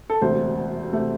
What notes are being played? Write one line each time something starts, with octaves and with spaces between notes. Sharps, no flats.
A4
E1 D2 C3 A3 C5
C3 A3